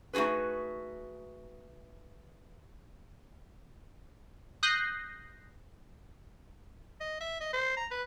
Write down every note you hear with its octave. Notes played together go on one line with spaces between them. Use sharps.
A3 D#4 F#4 G#4 B4
D#6 F#6 G6 A#6 C7
D#5
E5
D#5
C5
A#5
B4